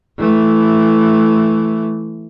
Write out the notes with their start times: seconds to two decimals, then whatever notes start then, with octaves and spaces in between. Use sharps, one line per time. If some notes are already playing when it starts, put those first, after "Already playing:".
0.18 E3 A3